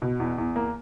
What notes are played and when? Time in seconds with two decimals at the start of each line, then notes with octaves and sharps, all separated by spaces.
0.02 B2
0.20 E2
0.38 E2
0.56 A#3